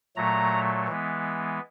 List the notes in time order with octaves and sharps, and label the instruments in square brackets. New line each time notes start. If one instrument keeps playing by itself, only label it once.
[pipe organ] A#2 F#3 A3 A#5
E3 G#3 B3